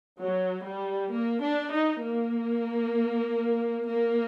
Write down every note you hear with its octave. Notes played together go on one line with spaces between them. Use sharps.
F#3
G3
A#3
D4
D#4
A#3
A#3